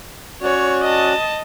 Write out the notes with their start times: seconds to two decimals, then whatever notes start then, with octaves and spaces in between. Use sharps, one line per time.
0.42 C#4 F#4 C#5 D5
0.84 D#5 A5